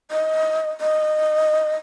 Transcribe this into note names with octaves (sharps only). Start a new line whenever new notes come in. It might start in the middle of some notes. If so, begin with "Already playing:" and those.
D#5
D#5